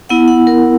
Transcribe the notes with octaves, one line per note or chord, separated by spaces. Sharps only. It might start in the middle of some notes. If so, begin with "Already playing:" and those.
B3 E4 F#5
F#5
A#4